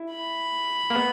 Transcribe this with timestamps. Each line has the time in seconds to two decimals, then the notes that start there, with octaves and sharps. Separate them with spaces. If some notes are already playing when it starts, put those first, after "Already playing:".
Already playing: E4
0.11 B5
0.90 A#3
0.95 B3